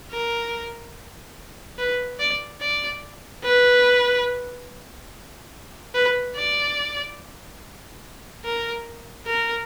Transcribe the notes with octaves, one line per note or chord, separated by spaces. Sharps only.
A#4
B4
D5
D5
B4
B4
D5
A#4
A#4